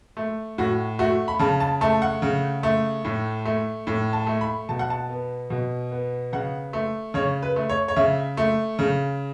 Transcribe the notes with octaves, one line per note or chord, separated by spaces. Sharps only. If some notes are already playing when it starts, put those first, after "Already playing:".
A3
A2 F#4
A3 F#4
B5
C#3 A5
A5
A3 A5
F#5
C#3
A3
A2
A3
A2
A5
A3
B5
B2 A5
F#5
A5
B3
B2
B3
C#3 F#5
A3
C#3 C#5
B4
A3
C#5
C#5
C#3 E5
A3
C#3